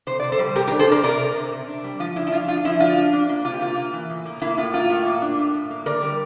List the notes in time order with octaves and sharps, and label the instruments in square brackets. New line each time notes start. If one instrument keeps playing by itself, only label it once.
[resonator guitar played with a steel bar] C3 C5
C3 D5
A4 C5
G3
C3 G4 A#4
G4 A#4
D4
A4 C5
D4 A#4 D5
C3 A#4 D5
C3
C3
C3
D4
G3
F3 F4
D4 E4
E4
F3 F4
D4 F4
F3 E4
D4 F4
F3
D4
A#3
C3 F4
G4
A#3 F4
A#3
E3
A2
A#3
A#3 E4
A2 F4
A#3 F4
A2
A#3
D4
A2
A2
A#3
D3 A#4 D5
G3